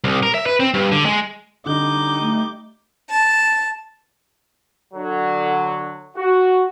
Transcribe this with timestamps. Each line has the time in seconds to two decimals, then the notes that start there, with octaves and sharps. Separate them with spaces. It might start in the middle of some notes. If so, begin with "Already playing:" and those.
0.04 C2
0.23 A#4
0.35 E5
0.46 B4
0.60 C4
0.74 G2
0.92 D3
1.05 G#3
1.66 D3 G3 D#4 D6 G6
2.20 A3
3.09 A5
4.94 D3 F#3
6.17 F#4